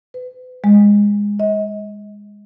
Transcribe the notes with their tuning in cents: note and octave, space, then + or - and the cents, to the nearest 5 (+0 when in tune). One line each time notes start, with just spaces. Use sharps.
B4 +40
G#3 -15
D#5 +35